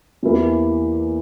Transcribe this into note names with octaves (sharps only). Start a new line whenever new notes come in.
E2 E3 A#3 E4 G4